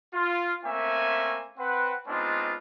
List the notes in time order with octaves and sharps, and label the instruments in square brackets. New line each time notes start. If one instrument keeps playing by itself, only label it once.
[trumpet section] F4
A3 A#3 C4 C#4 E5 G#5
C4 B4 F#5
G#3 B3 C4 D4 D#4 F4